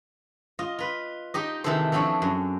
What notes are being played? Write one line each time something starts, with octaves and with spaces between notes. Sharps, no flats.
F4 D#5
F4 B4
D#4 G4 D#5
C3 D#3 E3 G#4 A4 C5
E3 F3 C4 D4 C#5
F#2